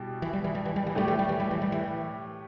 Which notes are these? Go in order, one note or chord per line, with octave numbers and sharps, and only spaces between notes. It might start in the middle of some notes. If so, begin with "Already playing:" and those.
Already playing: B2 G3 E4
E3
G3
E3
G3
E3
G3
E3
A2 G3 A3 G4
E3
G3
E3
G3
E3
G3
E3